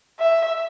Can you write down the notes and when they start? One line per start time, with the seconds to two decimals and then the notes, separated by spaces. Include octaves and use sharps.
0.19 E5